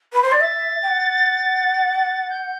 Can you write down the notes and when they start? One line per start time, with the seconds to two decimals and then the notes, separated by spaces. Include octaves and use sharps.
0.13 B4
0.22 C5
0.32 D5
0.41 E5 A6
0.82 G5
0.88 F#5
2.30 G6